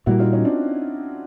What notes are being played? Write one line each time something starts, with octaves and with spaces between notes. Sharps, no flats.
A#2 G3 A#3 E4 F#4
D#4 F4
C#4 D#4
C4 D4